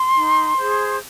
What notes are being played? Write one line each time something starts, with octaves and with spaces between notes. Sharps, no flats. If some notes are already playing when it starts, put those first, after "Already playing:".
Already playing: C6
D#4
G#4 C5